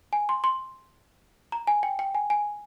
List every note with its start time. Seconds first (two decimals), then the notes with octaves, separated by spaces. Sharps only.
0.13 G#5
0.29 C6
0.44 C6
1.52 A#5
1.67 G#5
1.83 G5
1.99 G5
2.15 G#5
2.30 G#5